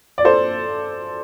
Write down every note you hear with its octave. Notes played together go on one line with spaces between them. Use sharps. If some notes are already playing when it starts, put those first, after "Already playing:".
D5
A4 C5